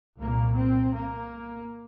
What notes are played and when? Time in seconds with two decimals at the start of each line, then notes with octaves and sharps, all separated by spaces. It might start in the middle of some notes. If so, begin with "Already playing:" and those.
0.19 C2 A#2 A#3
0.56 C4
0.93 A#3